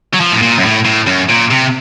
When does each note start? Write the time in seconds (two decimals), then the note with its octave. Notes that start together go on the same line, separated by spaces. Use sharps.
0.14 F#3
0.20 F3
0.32 A2
0.42 A#2
0.57 F#2
0.64 A2
0.85 A2
1.07 F#2
1.30 A#2
1.51 C3